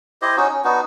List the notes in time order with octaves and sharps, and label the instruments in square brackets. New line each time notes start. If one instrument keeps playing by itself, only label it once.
[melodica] E4 G4 C5 D#5
C#4 D#4 F#4
C#4
B3 D4 D#4 F#4